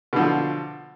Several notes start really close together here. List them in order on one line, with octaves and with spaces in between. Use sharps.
B2 D3 F3